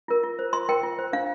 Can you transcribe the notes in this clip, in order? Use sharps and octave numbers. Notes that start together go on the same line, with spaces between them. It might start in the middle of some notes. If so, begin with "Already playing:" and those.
F4 A#4
F4
C5
F4 C6
A#4 G5
F4
C5
D4 F5